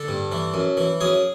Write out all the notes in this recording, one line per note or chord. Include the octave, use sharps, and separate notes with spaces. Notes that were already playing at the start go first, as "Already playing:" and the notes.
Already playing: D3 A4
G2
E3
F#2
E3
F#2 G#4